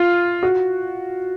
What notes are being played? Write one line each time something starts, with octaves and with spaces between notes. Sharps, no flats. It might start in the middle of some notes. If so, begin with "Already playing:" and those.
Already playing: F4
F#4